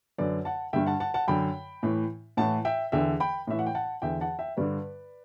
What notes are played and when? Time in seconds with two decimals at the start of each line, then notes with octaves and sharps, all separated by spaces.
0.18 F#2 D3 B4 D5
0.45 F#5 A5
0.73 G2 D3 E5 G5
0.86 F#5 A5
1.00 F#5 A5
1.14 F#5 A5
1.28 F#2 D3 G5 B5
1.83 A2 E3
2.37 A2 E3 F#5 A5
2.65 E5 G5
2.92 E2 D3 E5 G5
3.20 G5 B5
3.47 A2 E3 E5
3.59 F#5
3.67 G5
3.75 F#5 A5
4.02 E2 D3 E5 G5
4.21 F#5 A5
4.39 E5 G5
4.57 G2 D3 B4 D5